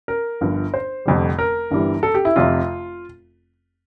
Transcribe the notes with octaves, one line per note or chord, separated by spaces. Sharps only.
A#4
G1 G2 F3
C5
F1 F2 D3 G3
A#4
G1 G2 E3 G3
A4
G4
E4
F1 F2 C3 F4